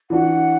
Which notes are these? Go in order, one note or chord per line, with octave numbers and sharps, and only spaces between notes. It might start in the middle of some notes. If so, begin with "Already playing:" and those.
E3 D4 F#4 F#5